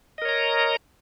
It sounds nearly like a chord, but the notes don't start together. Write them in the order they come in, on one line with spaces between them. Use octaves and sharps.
D#5 A#4 C#5 A#5